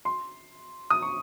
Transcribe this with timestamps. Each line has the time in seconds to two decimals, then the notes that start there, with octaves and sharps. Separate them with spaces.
0.05 C6
0.90 D#6
1.02 C#6